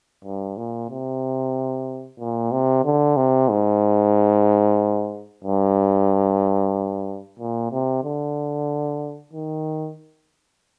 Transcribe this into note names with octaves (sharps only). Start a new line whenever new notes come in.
G2
A#2
C3
A#2
C3
D3
C3
G#2
G2
A#2
C3
D3
D#3